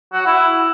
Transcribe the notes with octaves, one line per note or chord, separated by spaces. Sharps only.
F#4
E4